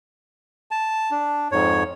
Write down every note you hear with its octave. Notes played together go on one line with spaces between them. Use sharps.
A5
D4
F2 G#2 C#5